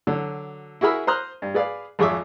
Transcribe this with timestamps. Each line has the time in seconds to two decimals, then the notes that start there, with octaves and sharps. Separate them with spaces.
0.07 D3 F#3
0.81 E4 F#4 G#4 A#4 B5 E6
1.07 C5 A#5 C6 D#6 F6 F#6
1.42 G2
1.54 G#4 B4 D5 F5
1.99 G#1 F2 G#4 C#5 E5 D6